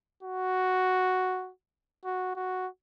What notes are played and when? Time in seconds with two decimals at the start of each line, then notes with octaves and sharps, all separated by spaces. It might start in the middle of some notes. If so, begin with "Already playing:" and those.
0.23 F#4
2.05 F#4
2.36 F#4